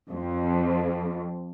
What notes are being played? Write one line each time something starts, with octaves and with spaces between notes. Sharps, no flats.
F2